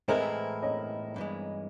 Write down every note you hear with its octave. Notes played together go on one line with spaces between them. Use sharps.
A2 E3 G#3 C4 E4 A#4 C5
C#5 D#5
G2 E3 G#3